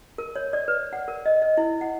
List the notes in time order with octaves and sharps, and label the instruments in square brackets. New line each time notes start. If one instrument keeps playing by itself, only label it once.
[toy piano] A#4
C#5
D5
B4
F#5
A#4
D#5
D#5
E4
F#5